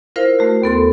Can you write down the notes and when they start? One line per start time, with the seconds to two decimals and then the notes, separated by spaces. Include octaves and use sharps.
0.16 E4 F4 A#4 C5 F5
0.39 A3 F#4
0.62 D#2 B3 A4 C6